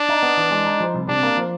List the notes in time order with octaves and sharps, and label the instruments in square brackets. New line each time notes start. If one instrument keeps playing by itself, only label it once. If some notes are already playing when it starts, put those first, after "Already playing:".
Already playing: [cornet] D4
[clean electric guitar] D#4
B3
E3
G#3
D#4
F3
C2
[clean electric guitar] C3 [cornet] D4
[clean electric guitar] A#3
F3